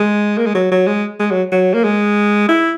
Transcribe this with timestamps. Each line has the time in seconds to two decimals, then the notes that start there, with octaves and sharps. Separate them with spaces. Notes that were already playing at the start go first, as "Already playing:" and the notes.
Already playing: G#3
0.38 A#3
0.46 G#3
0.55 F#3
0.72 F#3
0.87 G#3
1.20 G#3
1.31 F#3
1.52 F#3
1.74 A#3
1.84 G#3
2.49 E4